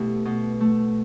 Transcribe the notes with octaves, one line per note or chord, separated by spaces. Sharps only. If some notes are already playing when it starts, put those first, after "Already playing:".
Already playing: B2 A3 E4 G4
B2
A3